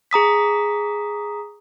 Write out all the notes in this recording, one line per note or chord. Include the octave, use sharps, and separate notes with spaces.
G#4 A#5 D#6 B6